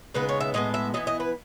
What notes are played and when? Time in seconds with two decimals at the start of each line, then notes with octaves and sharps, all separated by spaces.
0.14 C#3 G#3 B3 D#4 B4
0.29 C#5
0.40 E5
0.54 A2 G#3 B3 D#5
0.74 E5
0.94 E3 B3 E4 D#5
1.07 D#5
1.20 B4